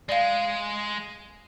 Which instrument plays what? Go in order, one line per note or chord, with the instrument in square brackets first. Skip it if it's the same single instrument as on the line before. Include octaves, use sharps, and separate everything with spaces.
[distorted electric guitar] G#3 [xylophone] D5 F5